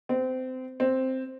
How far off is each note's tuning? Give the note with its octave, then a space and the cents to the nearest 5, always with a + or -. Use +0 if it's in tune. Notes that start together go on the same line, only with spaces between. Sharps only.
C4 -25
C4 +0